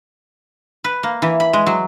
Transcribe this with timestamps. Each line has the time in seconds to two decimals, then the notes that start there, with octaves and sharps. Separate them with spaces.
0.84 B4
1.03 A#3
1.22 E3
1.40 B5
1.53 G#3
1.66 F#3